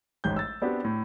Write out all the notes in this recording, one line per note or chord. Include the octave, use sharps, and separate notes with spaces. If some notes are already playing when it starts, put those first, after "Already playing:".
A1 G#2 G6
E6 A6
B3 C4 D4 F#4 G4 C5
A2